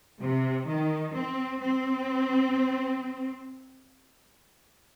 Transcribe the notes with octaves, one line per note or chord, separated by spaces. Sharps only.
C3
D#3
C4
C4